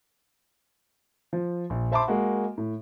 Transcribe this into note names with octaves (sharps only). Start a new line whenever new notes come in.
F3
A#1
C5 E5 A5 B5 C6 D6
G#3 A#3 F#4
A2